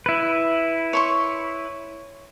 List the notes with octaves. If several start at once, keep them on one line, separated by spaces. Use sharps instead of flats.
E4 B4
C#5 C6 C#6